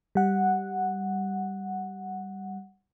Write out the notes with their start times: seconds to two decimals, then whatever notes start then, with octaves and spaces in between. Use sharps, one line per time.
0.15 G3 F#5